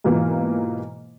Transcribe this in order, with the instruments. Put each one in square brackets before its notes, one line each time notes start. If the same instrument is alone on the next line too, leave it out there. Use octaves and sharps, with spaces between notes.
[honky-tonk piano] G#2 B2 E3 A#3 F4